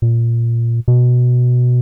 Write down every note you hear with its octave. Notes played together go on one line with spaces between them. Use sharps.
A#2
B2